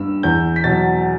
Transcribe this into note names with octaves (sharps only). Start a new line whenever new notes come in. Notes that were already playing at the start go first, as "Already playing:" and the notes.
Already playing: G2 E6
E2 G6
B6
B2 F#3 A6